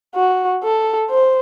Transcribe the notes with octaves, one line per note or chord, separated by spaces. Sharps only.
F#4
A4
C5